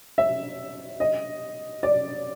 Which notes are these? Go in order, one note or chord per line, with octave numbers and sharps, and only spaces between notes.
E5
D#5
D5